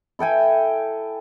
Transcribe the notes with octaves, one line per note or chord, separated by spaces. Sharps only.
E4 A4 G5 G#5